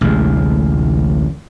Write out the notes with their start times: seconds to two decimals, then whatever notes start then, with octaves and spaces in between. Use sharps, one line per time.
0.01 A1 D2 C3 G#3